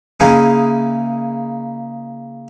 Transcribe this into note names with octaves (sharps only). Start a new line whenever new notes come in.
C#3 A#3 D#4 E4 G#4